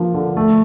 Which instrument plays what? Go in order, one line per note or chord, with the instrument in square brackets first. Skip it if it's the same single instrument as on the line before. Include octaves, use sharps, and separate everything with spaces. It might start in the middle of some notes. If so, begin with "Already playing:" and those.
Already playing: [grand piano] F3 A#3
D3
A3